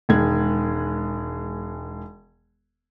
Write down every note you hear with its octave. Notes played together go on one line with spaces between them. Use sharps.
E1 D#3 G#3 G#6